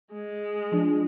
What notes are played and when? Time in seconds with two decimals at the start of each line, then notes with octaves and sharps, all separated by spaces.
0.13 G#3
0.72 F3 D4